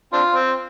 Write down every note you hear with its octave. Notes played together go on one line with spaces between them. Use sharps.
C4 D4 F4
C4